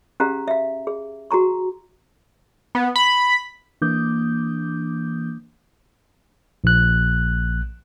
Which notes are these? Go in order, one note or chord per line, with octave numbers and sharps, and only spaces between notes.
C#4 G4 G#4 F5 A#5
E5 F5
G#4
F#4 G#4 A#5 C#6
B3
B5
E3 A#3 D4 D6 D#6 G6
A#1 F#6